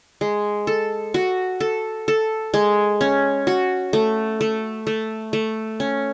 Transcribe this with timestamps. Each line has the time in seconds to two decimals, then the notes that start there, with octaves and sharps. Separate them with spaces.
0.21 G#3
0.67 A4
1.14 F#4
1.60 A4
2.08 A4
2.54 G#3
3.01 C#4
3.47 F#4
3.93 A3
4.41 A3
4.87 A3
5.33 A3
5.80 C#4